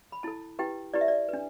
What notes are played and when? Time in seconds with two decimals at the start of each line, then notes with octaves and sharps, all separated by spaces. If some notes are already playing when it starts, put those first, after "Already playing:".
0.12 B5
0.23 E4 A4 A5
0.59 E4 G4 B4 G5
0.94 E4 G4 B4 D5
1.01 E5
1.08 D5
1.29 D4 B4